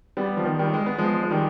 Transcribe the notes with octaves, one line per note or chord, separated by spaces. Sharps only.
G3 B3
F3
D#3
D#3 G3
G#3
B3
F3 G#3
G#3
D#3 G3